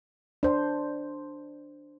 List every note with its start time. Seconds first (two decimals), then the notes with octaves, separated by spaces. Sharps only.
0.43 D4 C5